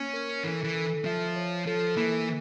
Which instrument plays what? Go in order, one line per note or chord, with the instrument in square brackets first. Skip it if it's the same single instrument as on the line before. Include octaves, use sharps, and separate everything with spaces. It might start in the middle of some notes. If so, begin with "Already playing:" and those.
Already playing: [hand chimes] A#3 [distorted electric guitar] C#4
[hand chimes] A#4
[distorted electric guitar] E3 [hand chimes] A4
[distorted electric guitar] E3
[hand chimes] A4
[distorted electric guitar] F3 [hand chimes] E5
[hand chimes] C#5
[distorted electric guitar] F3 [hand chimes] A4
[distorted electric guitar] E3 [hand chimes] A#3